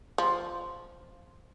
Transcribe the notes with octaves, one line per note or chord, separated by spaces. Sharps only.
F3